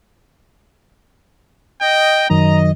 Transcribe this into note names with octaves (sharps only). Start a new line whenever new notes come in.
D#5 G5
F#2 D#3 F#3 D#5 A#5